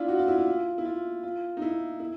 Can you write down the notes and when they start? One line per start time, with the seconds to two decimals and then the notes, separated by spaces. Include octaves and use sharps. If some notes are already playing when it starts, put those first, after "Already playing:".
Already playing: D4 E4 F4
0.08 F#4
0.19 F4
0.28 E4
0.38 F4
0.78 E4
0.85 F4
1.23 F4
1.57 D#4
1.62 E4
2.00 E4